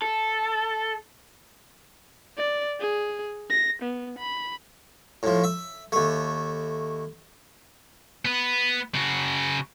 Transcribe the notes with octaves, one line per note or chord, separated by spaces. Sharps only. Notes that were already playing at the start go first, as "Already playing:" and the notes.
A4
D5
G#4
A#6
B3
B5
A2 F3
E5
D#2 A3
B3 B4
C#3 F#4